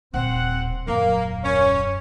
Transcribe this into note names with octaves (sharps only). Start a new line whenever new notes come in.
D#1 C4 F#5
D#1 F#2 A#3
C#4